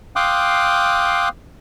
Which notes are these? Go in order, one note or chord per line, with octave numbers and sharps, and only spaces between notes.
F5 G5 C6 D6 D#6 F#6